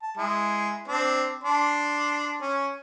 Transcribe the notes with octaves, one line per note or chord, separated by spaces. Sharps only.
A5
G#3 E4
C4 D4
D4 C6
C#4